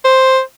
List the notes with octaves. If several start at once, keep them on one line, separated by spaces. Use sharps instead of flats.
C5